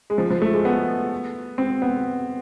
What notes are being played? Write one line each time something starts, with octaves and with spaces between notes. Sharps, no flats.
G#3
F3
F3
A3
G#3
B3
C4
B3